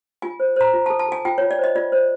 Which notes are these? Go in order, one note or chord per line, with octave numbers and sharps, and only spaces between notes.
F4 G#5
C5
C5 A#5
F4
A5
A4
A5
A4 G#5
F4 G5
F4 C#5
D5
C5 D#5
F4 D5
C5